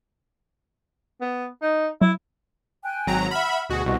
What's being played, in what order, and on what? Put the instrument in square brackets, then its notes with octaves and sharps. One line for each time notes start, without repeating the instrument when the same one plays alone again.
[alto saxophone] B3
D#4
[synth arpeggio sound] F#3 [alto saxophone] E4
[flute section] G5 G#5 F#6
[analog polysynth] G#1 F#3 A#5
[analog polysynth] E5 B5 [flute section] F#5 F6
[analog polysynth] D2 B2 F#4 [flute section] G#4
[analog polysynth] C2 B2 [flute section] F#4 D#5 C#6